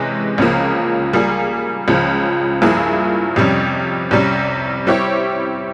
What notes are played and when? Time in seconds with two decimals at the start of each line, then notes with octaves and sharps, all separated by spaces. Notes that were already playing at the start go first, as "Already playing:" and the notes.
Already playing: C3 E3 G#3 C#4
0.38 C#2 C#3 F3 A#3
1.13 G3 A#3 F4 G#4
1.88 C#2 C#3 F3
2.62 G2 F3 A#3 E4 G#4
3.36 F2 C3 G3 C#4
4.11 C2 C3 G3 C#4
4.87 G3 C4 E4 G4 C#5